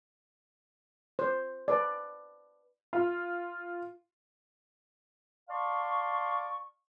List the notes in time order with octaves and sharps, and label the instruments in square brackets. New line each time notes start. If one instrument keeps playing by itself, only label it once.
[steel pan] C5
B4 D5
[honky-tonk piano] F4
[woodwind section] D5 F5 A5 C6 C#6